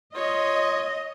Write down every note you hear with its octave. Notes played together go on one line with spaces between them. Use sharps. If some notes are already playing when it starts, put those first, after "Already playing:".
F4 C#5 D#5